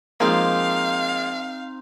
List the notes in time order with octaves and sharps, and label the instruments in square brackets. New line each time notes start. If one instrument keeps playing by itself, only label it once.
[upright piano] F3 G#3 A#3 [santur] C4 D#4 [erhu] F5